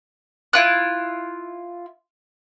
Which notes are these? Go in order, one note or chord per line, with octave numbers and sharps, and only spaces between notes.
E4 F4 F#6